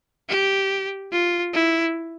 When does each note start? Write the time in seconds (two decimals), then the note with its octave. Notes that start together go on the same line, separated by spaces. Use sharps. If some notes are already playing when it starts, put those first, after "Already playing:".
0.29 G4
1.12 F4
1.53 E4